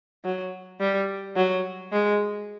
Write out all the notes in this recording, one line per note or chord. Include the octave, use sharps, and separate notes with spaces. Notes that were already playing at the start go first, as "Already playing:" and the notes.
F#3
G3
F#3
G#3